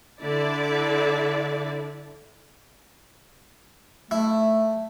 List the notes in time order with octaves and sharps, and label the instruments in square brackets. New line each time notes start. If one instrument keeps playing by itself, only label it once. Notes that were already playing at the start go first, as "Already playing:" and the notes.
[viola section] D3 E4 D5
[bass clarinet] A3 [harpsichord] E4